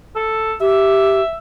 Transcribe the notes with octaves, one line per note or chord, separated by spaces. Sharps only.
A4
G4 E5